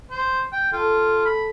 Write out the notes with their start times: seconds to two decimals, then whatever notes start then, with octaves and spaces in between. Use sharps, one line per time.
0.11 C5
0.53 G5
0.72 F4 A4
1.26 B5